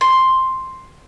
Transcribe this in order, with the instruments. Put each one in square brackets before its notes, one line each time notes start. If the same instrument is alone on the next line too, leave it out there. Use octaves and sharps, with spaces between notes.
[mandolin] C6